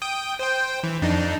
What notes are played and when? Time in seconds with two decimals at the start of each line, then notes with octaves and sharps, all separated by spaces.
0.02 G5 D#6 G6
0.39 C5 G5
0.83 E3
1.02 F2 D4 D#4